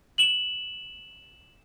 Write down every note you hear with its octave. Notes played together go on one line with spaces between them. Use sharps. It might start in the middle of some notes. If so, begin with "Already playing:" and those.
E7 F#7